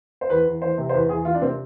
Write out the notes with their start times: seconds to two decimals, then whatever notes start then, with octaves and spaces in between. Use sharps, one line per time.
0.21 C5
0.30 E2 B4
0.46 E2
0.62 E3 C5
0.78 C3
0.89 C5
0.94 E2 B4
1.09 E2 G#4
1.25 E3 F4
1.34 D4
1.41 C3 C4